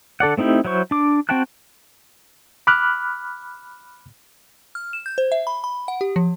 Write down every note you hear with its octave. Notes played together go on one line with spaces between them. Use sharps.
D3 A4 D5 F#5
A3 C4 D#4 E4 G4
F#3 E4 C5 C#6
D4 D6
C4 F#4 G5 A5 F#6
B5 D6 F6 F#6
F6
E7
G6
C5
E5
B5
B5
F#5
G4
F3